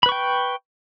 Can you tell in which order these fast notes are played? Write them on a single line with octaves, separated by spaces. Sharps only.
B5 B4 C#6 G5